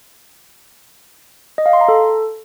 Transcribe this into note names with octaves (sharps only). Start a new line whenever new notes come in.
D#5
F5
C6
A#5
A4